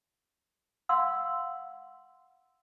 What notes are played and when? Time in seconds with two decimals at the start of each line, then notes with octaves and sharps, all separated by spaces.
0.89 F5 F#5 C6 E6